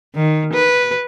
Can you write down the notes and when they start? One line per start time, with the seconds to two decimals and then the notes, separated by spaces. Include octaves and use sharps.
0.15 D#3
0.53 B4